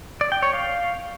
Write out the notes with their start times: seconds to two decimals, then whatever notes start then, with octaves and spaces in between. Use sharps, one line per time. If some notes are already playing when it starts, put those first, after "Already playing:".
0.21 D5
0.32 G5
0.43 C#5
0.53 F5